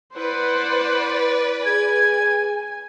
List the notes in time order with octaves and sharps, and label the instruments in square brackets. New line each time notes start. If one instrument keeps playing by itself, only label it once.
[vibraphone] E4 [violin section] B4 D5 [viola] C5 F#5
[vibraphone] G#4 [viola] G#5 [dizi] G#6